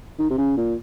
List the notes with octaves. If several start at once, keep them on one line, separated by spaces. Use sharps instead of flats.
D#3
C3
C#3
A#2